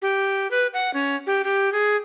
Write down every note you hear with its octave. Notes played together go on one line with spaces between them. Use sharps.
G4
B4
F#5
C#4
G4
G4
G#4